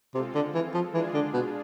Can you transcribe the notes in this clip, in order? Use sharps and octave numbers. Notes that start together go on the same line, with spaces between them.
C3 G#3 C4 F4 A4
D3
E3
F3
E3 G#3 D4 F4 G#4
D3
B2